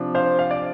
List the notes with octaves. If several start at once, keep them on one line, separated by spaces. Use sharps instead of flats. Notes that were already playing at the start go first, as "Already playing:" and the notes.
Already playing: C3 F3 D4
C5 F5
F5
D5